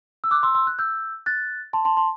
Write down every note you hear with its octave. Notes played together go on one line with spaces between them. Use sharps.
E6
D6 F#6
C6 E6
C6 E6
F#6
E6 G6
F#6 A6
A5 C6
A5 C6
A5 C6